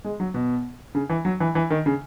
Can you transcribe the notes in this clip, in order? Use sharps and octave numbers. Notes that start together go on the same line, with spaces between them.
G#3
F#3
B2
C#3
E3
F#3
E3
E3
D#3
C#3